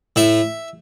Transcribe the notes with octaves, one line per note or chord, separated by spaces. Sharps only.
A2 E5